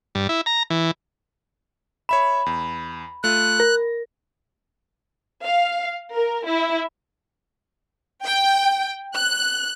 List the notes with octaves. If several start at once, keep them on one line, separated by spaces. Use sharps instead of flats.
G2
E4
A#5
E3
C#5 E5 B5 E7
E2
A3 F4 F#6
A#4 A#6
F5
A#4
E4
G5
F#6